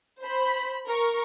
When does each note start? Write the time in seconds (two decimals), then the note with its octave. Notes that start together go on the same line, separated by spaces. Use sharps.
0.21 C5 B5
0.88 A#4 C#6